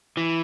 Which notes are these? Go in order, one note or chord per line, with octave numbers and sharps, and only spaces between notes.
E3